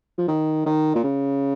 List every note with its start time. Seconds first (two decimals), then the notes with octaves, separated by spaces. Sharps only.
0.18 F3
0.28 D#3
0.66 D#3
0.95 A#2
1.04 C#3